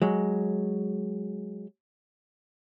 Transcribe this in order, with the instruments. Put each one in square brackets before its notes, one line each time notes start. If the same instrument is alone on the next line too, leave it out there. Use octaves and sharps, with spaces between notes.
[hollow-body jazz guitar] F#3 G#3